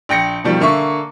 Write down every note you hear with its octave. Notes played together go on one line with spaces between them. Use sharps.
A#1 G5 A#6 C#7
B2 D#3 F3 G3
D3 A#3 E5 C#6